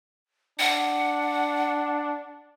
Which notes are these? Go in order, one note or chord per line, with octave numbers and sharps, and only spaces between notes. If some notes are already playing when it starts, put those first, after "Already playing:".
D4 F#5